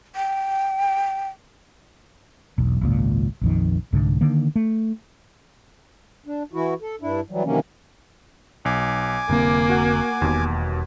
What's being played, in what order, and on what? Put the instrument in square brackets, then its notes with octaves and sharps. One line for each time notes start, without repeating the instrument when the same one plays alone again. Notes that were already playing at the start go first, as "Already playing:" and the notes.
[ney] G5
[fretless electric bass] E1 B1
G#1 C#2 A#2
A#1 F2 D#3
C2 G#2 D3
D3 D#3 A#3
A3
[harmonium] D4
E3 E4 F#4
A4
G2 D4 E4
E3 F#3 G3
C3 D#3 E3 F#3 A#3 C#4
[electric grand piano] B1 [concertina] G#5 D6
[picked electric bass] F1 D3 C4 [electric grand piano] C2 [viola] A#3
[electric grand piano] F#4 F#5
[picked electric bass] E1 [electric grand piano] D#2 B2